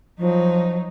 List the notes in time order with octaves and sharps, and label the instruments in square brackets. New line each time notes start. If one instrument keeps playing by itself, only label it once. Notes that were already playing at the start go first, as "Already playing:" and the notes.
[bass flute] F3 [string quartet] F#3 D#4